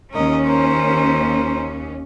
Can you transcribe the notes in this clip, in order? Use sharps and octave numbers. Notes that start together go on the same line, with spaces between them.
D#2 C#4 A#4 D#5
A#4 C5